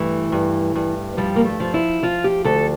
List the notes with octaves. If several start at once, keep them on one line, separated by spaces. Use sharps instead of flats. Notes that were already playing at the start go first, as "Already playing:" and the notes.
Already playing: G2 E3 A3
G2
G2
F3 G3
A#3
A3
F3
E4
F3 F4
G4
D2 A4